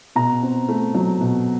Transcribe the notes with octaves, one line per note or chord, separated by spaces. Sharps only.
B2 A#5
C4
A3
F#3
B2